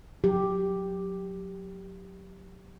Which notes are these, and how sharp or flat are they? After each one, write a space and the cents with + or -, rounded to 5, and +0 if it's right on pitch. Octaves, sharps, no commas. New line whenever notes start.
F#3 -20 G4 +0